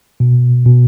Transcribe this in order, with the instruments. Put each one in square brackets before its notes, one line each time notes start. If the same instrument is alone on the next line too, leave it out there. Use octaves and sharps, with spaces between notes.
[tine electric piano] B2
B2